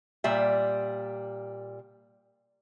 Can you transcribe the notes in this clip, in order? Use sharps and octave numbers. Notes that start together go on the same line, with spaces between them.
A#2 G3 E5